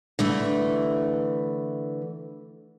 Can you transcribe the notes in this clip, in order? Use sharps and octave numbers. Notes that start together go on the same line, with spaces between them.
D3 E3 A3